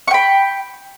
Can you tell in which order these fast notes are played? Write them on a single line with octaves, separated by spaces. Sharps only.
C#6 G5 B5